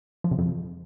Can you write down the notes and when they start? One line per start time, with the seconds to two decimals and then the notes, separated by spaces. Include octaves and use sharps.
0.24 F3
0.31 C3
0.39 F2